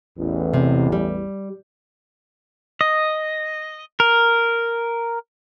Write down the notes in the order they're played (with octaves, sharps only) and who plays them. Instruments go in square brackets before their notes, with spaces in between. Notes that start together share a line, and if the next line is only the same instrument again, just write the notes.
[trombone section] A1 E2
[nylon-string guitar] C3
G3
[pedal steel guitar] D#5
A#4